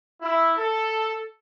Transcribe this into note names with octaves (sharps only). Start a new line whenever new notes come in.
E4
A4